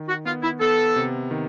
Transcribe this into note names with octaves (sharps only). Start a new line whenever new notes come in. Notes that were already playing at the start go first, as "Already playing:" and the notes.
Already playing: D#3
F#4
B3 F4
E4
B3 A4
C3
D#3